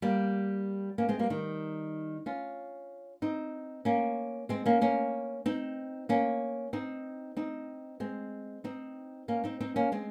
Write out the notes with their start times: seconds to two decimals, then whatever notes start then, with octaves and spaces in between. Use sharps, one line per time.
0.02 G3 A#3
0.98 A#3 C#4
1.09 G#3 C4
1.19 G3 A#3
1.30 D#3 G3
2.26 C#4 F4
3.22 C4 D#4
3.85 A#3 C#4
4.49 G#3 C4
4.66 A#3 C#4
4.81 A#3 C#4
5.46 C4 D#4
6.09 A#3 C#4
6.73 C4 D#4
7.37 C4 D#4
8.00 G#3 C4
8.64 C4 D#4
9.28 A#3 C#4
9.44 C4 D#4
9.60 C4 D#4
9.76 A#3 C#4
9.92 G#3 C4